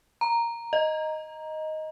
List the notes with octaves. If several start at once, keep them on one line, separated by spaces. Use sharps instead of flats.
A#5
D#5